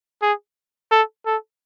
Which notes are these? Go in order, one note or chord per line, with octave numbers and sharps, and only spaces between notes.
G#4
A4
A4